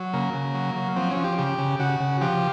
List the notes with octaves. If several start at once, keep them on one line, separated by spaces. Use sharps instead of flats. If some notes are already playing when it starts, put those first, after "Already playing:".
Already playing: F#3
C#3 A#3
C#3
F#3
F#3
F3 C4
C#4
F3
G4
C#3 G4
C#3
C#3 F#4
C#3
F3 G4